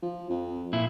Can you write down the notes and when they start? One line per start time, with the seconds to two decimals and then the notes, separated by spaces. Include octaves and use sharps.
0.02 F3
0.30 F2
0.73 A#2 E4